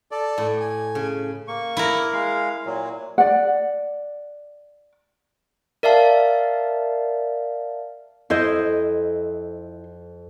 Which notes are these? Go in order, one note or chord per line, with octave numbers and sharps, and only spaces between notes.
A4 D5
A2
G#5
C#3
A#3 C#6
E4 A#4
G#3 F5
A#2 F#3
D5 F#5
A#4 D5 E5 F5 A5
F2 E4 C5 D#5